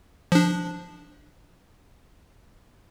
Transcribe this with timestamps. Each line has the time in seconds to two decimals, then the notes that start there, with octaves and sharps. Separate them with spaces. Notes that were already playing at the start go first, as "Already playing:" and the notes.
0.32 F3 D4